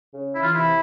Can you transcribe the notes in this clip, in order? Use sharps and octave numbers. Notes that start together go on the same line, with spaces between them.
C#3
E3 E4
F4
C3 E4